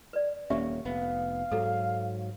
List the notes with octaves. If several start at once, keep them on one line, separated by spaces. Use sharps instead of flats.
B4 D5
D#1 A#3 C#4 G4 E5
F1 B3 F5
G#2 F#3 A4